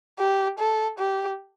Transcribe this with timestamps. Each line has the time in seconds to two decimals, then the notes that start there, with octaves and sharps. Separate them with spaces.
0.19 G4
0.59 A4
0.99 G4